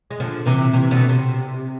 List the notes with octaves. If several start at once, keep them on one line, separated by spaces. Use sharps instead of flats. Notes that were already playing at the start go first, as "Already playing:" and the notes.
G#3
D3 F3
C3 E3
C3 E3
B2 D3
C3